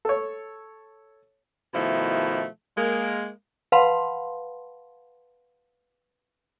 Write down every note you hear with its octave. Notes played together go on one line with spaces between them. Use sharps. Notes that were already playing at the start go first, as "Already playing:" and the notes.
A4 C#5
B2 D#3 F3 A3 E4
G#3 A#3
B4 F5 F#5 A5 B5 C6